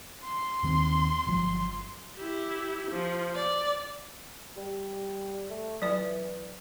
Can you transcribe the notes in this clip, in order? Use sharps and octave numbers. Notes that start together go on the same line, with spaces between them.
C6
D#2 D#3 C4
G1 F3 F#3
E4 G4
F3
D5
G3
A3
E3 F#3 D5